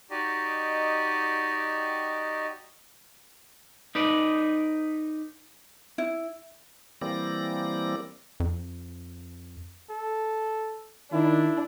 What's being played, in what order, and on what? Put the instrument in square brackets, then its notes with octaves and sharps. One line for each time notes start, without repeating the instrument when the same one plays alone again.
[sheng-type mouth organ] D#4 F#4 G4 D5 D#5
[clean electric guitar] D#4 B4 D5
[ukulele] E4
[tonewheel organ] E3 G3 A#3 C4 D5 A#6
[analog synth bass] F2
[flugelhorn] A4
[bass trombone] D#3 [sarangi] D4 [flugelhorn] E4